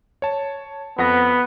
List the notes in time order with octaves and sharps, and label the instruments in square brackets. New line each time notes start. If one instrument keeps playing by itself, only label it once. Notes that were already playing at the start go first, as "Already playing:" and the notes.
[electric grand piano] C#5 A5
[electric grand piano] F2 F#5 A#6 [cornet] B3